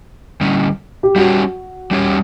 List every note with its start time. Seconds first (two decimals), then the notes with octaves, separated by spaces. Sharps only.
0.41 D3 G3 C#4
1.03 G4
1.16 G3 C#4 F#4 G4 C#5
1.91 G3 C#4 G4 C#5